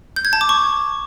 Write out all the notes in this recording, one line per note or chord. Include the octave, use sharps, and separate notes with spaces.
G6
G#6
A5
D6
C#6